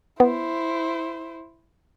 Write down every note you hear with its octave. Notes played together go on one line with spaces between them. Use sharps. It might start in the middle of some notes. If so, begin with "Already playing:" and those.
B3 E4 C5